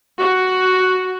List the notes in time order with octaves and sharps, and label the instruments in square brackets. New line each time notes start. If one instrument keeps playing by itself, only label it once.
[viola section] F#4